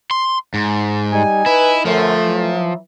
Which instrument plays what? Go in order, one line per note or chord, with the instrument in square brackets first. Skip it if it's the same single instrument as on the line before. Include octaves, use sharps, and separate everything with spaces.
[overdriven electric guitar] C6
G#2
[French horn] G3 [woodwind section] D#4 G#5
[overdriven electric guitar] E4 [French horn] B4
[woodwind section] F#2 D3 [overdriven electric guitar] F3 [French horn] A3
[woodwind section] E3 F#3